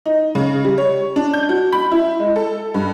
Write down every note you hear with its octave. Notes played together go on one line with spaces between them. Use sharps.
D#4
C#3
G3
C#5
D4
G6
F#4
B5
E4
G#3
A4
G2